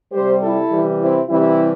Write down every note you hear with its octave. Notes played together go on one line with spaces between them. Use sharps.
C3 G3 G4 C5
E4 A4
C3 E3 G3
C4 E4
C3 E3 G3 C4 E4